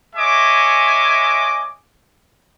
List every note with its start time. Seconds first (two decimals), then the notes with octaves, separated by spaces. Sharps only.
0.16 G#3 C#5 D#5 E5 G#5 D6